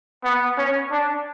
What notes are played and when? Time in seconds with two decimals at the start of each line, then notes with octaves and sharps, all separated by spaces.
0.24 B3
0.58 C#4
0.91 D4